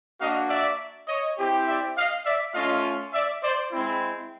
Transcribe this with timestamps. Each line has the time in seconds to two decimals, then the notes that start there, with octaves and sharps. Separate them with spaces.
0.20 A#3 D4 F#4 D#5 F5
0.49 D5 E5
1.07 C#5 D#5
1.38 C4 E4 G4
1.66 D5 E5
1.97 D#5 F5
2.25 D5 E5
2.54 A3 C#4 F4 D#5 F5
3.13 D5 E5
3.43 C5 D5
3.72 G#3 C4 E4